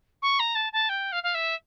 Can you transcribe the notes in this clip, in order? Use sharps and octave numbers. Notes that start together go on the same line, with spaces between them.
C#6
A#5
A5
A5
G5
F5
F5
E5